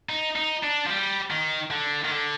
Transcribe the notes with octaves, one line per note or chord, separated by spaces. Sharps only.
D#4
D#4
D4
F3
G3
D#3
D3
D#3
D3